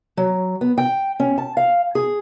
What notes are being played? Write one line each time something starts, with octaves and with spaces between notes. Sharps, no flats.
F#3
B3
G5
C#4
A5
F5
G#4